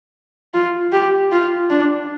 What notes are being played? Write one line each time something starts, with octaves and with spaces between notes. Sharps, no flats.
F4
G4
F4
D4